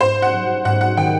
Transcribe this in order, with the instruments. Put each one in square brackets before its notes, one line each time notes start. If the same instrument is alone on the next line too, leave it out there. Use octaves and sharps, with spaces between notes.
[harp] G#2 [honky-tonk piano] C5
[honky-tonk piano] F#5
[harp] F#3
[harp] G#2 [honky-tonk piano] F#5
[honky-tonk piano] F#5
[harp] D#3 [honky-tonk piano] G5